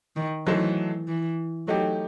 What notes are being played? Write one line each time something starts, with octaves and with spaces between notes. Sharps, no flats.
D#3
E3 F#3 A3 D#4 A4 C5
E3
F#3 A3 D#4 G4